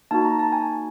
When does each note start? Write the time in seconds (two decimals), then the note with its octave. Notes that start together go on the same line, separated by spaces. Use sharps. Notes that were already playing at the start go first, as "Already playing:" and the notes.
0.11 A#3 D#4 F#4 A5
0.25 A#5
0.39 A5
0.52 G#5